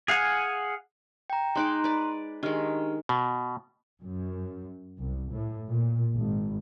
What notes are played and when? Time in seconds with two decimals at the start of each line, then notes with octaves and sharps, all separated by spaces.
0.08 G#4 F5 F#5 G#5
1.30 G5 A#5
1.55 G#3 D#4 A#5 C6 D6 F#6
1.84 B4 D5
2.43 D#3 G#3 D4 G4 F6
3.09 B2
4.03 F#2
4.99 C2
5.32 A2
5.69 A#2
6.15 G#1